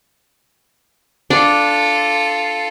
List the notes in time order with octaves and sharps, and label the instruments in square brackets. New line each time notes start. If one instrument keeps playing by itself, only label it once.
[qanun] D4 [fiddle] F4 A4